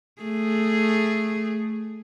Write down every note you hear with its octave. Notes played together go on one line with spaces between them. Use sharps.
A3 G#4